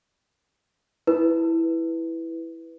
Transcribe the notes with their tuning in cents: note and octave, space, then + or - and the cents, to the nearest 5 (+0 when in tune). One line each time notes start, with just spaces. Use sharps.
E4 +0 B4 +0